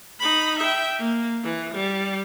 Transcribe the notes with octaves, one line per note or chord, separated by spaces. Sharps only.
D#4 B5
E5 G5
A#3
E3
G3